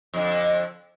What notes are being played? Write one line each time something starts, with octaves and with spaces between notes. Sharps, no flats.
F2 D3